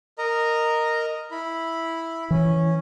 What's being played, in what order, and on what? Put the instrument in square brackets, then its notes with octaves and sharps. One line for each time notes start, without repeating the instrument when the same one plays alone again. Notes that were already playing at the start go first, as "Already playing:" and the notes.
[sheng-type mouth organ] A#4 D#5 A#5
E4 B5
[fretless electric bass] E3 [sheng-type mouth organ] C#4